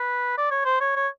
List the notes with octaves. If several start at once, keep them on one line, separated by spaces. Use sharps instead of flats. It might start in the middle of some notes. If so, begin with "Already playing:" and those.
Already playing: B4
D5
C#5
C5
C#5
C#5